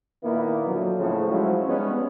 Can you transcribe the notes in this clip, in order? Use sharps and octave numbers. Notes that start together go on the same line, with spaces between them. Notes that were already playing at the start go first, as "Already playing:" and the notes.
A#2 D#3 A#3 B3 E4
D3 F3 F#3
A2 C#3 F3
F3 F#3 G#3 C#4 E4
G3 G#3 B3 C#4 D#4